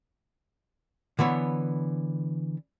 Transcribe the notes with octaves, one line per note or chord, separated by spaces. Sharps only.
D3 E3 B3 C#5